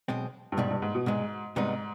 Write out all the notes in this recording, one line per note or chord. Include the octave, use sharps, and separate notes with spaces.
B1 B2 G#3 C4
G2
C2 G#2 B2 G3
G2
G#2
B2
C2 G#2 B2 G#3
G#2 C3 G3 B3 D#4